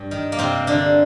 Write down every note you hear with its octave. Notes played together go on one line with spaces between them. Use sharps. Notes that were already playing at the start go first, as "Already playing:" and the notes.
Already playing: G2
D#3
A#3
G2 C3 C4
G2 D3 D4